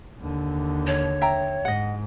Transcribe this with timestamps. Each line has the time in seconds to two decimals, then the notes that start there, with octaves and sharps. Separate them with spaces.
0.19 D#2 D3
0.87 C#5
1.21 E5 G5 A#5
1.65 G#2 D#5 F#5